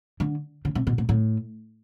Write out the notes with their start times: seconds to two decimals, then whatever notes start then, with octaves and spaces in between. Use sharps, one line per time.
0.20 D3
0.65 C#3
0.75 C3
0.87 B2
0.98 A#2
1.09 A2